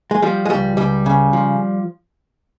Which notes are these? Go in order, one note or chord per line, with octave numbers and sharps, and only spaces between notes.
G#3
F3 G3
G#3
C#2 G3
C#2 G3
C#3
F3